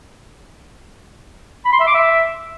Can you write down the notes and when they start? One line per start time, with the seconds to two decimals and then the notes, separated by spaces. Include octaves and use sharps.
1.65 B5
1.72 C6
1.80 E5
1.87 D6
1.94 E5